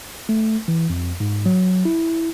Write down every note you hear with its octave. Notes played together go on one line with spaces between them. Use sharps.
A3
E3
F2
G#2
F#3
E4